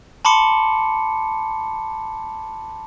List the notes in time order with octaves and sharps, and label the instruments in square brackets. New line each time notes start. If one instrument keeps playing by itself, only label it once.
[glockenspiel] A5 B5 C6 D6 C#7